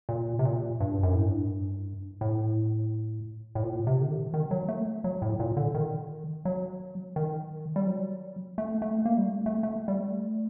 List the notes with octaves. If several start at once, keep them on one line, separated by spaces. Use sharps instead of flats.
A#2
C3
A#2
G2
F#2
A2
G2
A2
A2
A#2
C3
D3
D#3
D#3
F#3
A3
F#3
A2
A#2
D3
D#3
F#3
D#3
G3
F#3
A3
A3
A#3
G3
A3
A3
A3
G3
A3